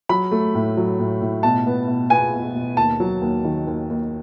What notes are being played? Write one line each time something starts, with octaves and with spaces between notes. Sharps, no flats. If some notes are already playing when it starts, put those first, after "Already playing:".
F#3 B5
A3
A2
F#3
A2
A2
B2 A5
B3
B2
B3 G#5
B2
B2
D#2 A5
F#3
D#2
D#3
D#2
D#2